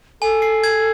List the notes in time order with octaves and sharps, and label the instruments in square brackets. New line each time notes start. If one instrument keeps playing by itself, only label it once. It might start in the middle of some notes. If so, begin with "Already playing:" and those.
[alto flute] A4 [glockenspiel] G#5
[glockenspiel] C7
G#6